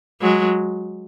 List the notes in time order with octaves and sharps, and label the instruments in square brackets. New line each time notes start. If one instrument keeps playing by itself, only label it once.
[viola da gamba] F#3 G#3